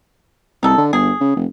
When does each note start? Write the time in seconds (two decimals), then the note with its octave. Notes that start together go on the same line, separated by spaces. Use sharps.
0.63 C2 D#4 A4
0.77 D3
0.93 G1 G#4
1.20 C#3
1.36 F1